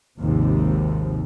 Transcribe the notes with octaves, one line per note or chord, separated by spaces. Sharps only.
G#1 D#2 C3 F3